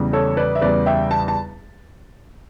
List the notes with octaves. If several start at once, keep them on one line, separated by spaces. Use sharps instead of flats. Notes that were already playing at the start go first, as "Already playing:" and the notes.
Already playing: E2 C#3 G3
A4 C#5
B4 D5
E5
E2 C#3 G3 B4 D5
E5 G5
A5
A5